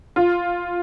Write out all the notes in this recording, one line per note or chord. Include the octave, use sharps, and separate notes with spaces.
F4